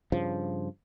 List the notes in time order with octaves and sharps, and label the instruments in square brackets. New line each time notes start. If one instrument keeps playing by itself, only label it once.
[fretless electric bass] G2 C#3 F3